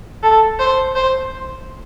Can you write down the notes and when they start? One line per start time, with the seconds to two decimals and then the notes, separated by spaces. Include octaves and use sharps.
0.23 A4
0.60 C5
0.95 C5